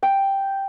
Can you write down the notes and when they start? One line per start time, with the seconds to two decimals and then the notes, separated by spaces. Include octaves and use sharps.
0.03 G5